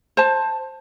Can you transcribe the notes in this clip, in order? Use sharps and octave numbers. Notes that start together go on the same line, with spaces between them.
C5 A5